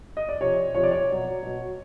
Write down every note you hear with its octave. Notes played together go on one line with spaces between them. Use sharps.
D#5
D5
C3 F3 C#5
C3 F3 C#5
D5
C#5
B2 F#3
B2 F#3